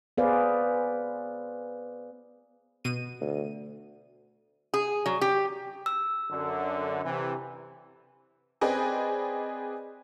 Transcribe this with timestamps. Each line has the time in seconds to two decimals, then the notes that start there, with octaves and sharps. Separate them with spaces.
0.18 B3 G#4 B4 C5 D5 F5
2.84 B2 D#7
3.21 D2
4.74 G#4
5.06 F#3
5.21 G4
5.86 E6
6.30 F#2 D3
7.05 C3 E3
8.61 C4 G#4 B4 D5 D#5 G5